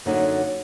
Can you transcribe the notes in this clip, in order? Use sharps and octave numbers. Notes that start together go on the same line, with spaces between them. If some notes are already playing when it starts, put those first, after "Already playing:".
F#2 D3 F#3 A#3 D#4